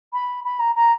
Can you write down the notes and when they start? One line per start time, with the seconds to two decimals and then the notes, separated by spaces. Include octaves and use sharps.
0.13 B5
0.44 B5
0.59 A#5
0.75 A#5